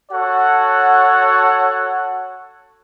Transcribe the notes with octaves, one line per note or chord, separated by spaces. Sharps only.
F#4 A4 C#5 F#5